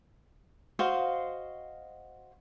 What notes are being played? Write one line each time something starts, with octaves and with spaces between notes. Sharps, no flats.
F#4 C5 D#5 F5